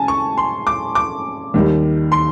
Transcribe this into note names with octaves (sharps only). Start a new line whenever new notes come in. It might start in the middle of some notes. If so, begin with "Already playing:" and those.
Already playing: C#3 G#5 A5
C#6
C6
D6
D6
D#2 D#3 G3
C6